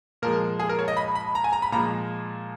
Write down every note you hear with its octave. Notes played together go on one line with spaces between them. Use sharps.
A#2 F3 G#3 A#4
G#4
A#4
C#5
D#5
B5
B5
A#5
G#5
A#5
B5
A#2 F3 G#3 A#5